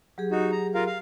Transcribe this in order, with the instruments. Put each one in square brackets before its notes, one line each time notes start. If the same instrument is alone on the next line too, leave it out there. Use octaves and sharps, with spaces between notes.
[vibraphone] F#3 G4 G#4
[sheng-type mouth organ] D#4 F#4
A#5
F4 A#4 F5
F5